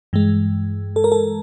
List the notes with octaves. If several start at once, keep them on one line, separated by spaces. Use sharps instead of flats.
G2 E3 G#3
A4
A#4
A4